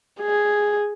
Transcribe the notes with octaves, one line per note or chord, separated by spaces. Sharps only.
G#4